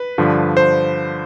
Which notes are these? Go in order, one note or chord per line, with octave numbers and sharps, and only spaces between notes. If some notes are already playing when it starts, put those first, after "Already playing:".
Already playing: B4
G2 D3 F3
C5